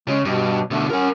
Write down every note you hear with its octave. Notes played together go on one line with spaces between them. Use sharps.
C#3 G#3
G2 B2
B2 D3 A3
C#4 A#4 F#5